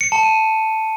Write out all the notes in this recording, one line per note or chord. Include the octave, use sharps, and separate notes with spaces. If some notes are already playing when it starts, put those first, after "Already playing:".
C#7
A5
D#7